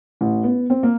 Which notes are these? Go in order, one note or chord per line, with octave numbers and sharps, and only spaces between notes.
A1
B3
C4
A#3